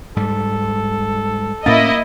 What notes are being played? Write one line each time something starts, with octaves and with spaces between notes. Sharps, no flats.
G#2 G3 A4
A2 A#3 C#4 E4 D#5 A6